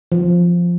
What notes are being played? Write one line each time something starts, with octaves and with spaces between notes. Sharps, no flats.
F3